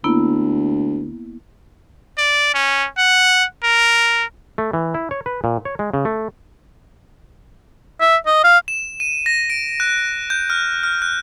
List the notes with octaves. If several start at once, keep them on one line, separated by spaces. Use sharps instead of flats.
D2 A#3 B3 E4
D5
C#4
F#5
A#4
A3
E3
E4
C#5
B4
A#2
C#5
G#3
C#3
A3
E5
D#5
F5
E7
D#7
A#6
D7
F#6
G6
F6
F6
F#6